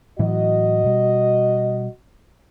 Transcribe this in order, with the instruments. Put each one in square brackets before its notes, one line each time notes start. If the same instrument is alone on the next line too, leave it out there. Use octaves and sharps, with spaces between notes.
[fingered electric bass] A2 E3 F#3 [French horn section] F#4 D#5
[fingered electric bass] B2 G3